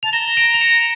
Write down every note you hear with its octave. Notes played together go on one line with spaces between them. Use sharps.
A5 F7
A#5 E7 G7
G7
D7 F7
F7
C#7 E7